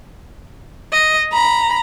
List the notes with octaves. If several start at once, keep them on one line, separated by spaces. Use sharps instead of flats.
D#5
A#5 B5